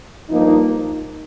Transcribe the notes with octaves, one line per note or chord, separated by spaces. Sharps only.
G2 F3 A#3 D#4